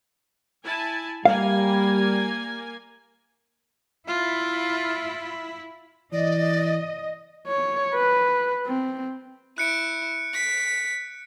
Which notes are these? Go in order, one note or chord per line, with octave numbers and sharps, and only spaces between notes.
E4 G#5 A5
G3 A#3 F5 G#5
E4 F4
E3 D5 D#5
C#5
B4
C4
E4 F#6 C#7 D7
B6